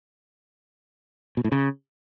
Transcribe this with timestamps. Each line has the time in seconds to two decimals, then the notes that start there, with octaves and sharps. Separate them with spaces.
1.37 B2
1.44 A2
1.52 C#3